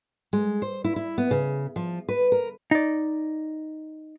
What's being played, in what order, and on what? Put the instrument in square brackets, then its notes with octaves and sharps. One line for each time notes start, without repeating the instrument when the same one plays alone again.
[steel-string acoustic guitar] G#3
C5
E4
E4
B3
C#3
F3
B4
A#4
[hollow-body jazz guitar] D#4 D5